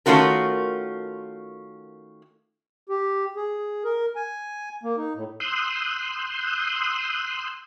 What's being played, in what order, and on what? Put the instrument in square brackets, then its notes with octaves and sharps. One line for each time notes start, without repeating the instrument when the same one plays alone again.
[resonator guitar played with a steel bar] D#3 A3 C#4 F4 F#4 A#4
[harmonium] G4
G#4
A#4
G#5
A#3
D#4
A2
[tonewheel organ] C6 D#6 E6 F#6 G6